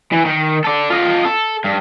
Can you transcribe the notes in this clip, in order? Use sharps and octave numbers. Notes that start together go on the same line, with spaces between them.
E3
D#3
A4 D5
F4 D#5
A4
G2